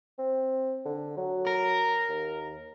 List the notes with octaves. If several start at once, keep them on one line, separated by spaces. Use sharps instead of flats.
C4
D3
F#3
A#4
D#2